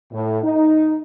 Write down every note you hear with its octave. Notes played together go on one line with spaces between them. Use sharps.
A2
D#4